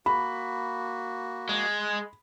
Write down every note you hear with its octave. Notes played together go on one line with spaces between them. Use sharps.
A#3 F#4 B5
G#3